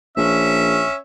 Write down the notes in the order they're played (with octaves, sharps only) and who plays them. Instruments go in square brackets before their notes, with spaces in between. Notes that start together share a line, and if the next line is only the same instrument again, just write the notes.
[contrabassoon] A#1 [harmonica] C#4 E5